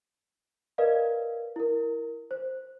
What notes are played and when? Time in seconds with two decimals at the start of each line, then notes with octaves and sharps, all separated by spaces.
0.78 A#4 B4 D5 D#5 F5
1.56 E4 A#4
2.31 C5